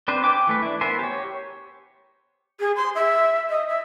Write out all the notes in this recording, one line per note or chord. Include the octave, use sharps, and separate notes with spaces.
C4 D4 B4 C5
B4 G5 G#5 D6
E3 A3 B4
D4 E4
B3 E4 A#4 C5 G#5
G4 C#5
G#4
C6
E5
D#5
E5